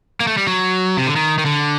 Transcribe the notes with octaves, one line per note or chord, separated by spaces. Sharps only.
A#3
A3
G3
F#3
C3
D3
D#3
D#3
D3